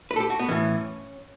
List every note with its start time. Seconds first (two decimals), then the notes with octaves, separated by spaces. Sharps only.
0.11 B4
0.16 A4
0.20 G4
0.30 F#4
0.39 B3
0.48 A2 E3 C#4